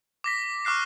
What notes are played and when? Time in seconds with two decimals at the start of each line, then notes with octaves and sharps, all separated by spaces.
0.24 D6 A#6 B6
0.65 C#6 D6 F6 F#6 C7